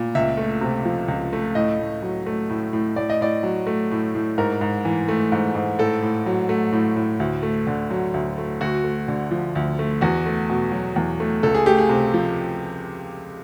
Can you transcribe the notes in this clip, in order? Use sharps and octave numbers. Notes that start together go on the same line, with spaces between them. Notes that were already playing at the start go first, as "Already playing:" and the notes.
Already playing: A#2
C#2 E5
A3
C3
F3
C#2
A3
A2 D#5
A2
F#3
A3
A2
A2
A2 D5
D#5
A2 D5
F#3
A3
A2
A2
G#2 A#4
G#2
E3
A3
G#2
G#2
A2 A4
A2
F#3
A3
A2
A2
D2
A3
D3
F#3
D2
A3
D2 F#4
A3
D3
F3
D2
A3
E2 F#4
A3
B2
F#3
E2
A3
C#2 A4
G#4
A3 G4
G#4
C3
F3